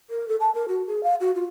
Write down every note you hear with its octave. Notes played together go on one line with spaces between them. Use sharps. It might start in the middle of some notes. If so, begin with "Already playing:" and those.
A#4
A4
A5
A#4
F#4
G#4
F5
F#4
F4